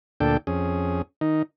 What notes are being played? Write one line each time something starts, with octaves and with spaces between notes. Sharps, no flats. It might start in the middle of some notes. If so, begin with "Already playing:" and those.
D2 A#2 D4 A4 G5
F2 C#4 G#4
D#3 D#4